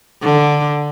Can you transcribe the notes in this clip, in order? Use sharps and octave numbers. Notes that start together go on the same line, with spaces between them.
D3